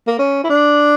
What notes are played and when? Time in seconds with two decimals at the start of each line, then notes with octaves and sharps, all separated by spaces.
0.07 A#3
0.19 C#4
0.44 E4
0.50 D4